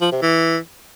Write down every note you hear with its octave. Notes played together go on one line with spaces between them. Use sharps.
F3
C3
E3